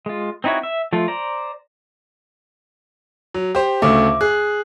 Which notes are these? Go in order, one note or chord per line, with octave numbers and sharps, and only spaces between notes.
G#3 F4
C4 D#4 E4 F#4 C#5
E5
F3 A3 F4
C5 D5 A#5
F#3
G4 C5
D2 C#3 A3 E5 D6
G#4 F#6